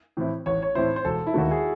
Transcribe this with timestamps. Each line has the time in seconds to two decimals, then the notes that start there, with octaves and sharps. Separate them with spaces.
0.17 A2 E3 C4 E4
0.46 A1 C#5
0.62 C#5
0.75 A2 E3 C4 E4 C5
0.96 C5
1.05 E1 A4
1.27 E4
1.34 D#2 D#3 A3 F#4
1.51 G#4